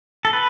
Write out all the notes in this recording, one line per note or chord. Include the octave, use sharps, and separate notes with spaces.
A4
B4